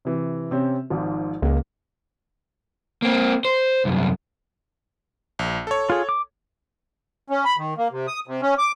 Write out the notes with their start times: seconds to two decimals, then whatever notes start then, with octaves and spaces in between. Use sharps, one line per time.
0.05 C3 E3
0.51 C3 C4 C#4
0.90 G#1 G#2 F3
1.42 C#2 A#3
3.02 A#3 C4
3.45 C5
3.85 C2 F#2
5.39 A#1
5.67 A4 C#5
5.90 F4 G#4
6.09 D6
7.30 C#4
7.45 B5
7.58 D#3
7.78 A#3
7.91 C3
8.07 D#6
8.27 C3
8.42 C#4
8.58 D6